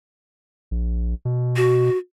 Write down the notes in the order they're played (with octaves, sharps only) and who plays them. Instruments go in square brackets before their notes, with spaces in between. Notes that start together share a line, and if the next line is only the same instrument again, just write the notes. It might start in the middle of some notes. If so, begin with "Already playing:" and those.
[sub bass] A#1
B2
[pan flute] F#4